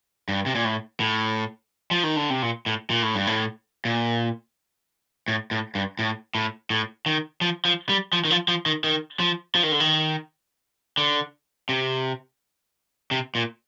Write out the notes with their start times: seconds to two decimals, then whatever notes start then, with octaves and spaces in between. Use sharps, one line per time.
0.29 G2
0.46 C3
0.55 A#2
0.65 A2
1.00 A2
1.91 F3
2.04 D#3
2.16 D3
2.30 C3
2.43 A#2
2.66 A2
2.90 A#2
3.03 A2
3.15 G2
3.27 A2
3.85 A#2
5.28 A2
5.51 A2
5.75 G2
5.99 A2
6.35 A2
6.70 A2
7.06 D#3
7.41 F3
7.65 F3
7.89 G3
8.13 F3
8.25 D#3
8.30 F3
8.48 F3
8.66 D#3
8.84 D#3
9.20 F3
9.55 F3
9.63 D#3
9.72 D3
9.80 D#3
10.98 D3
11.69 C3
13.11 C3
13.35 A#2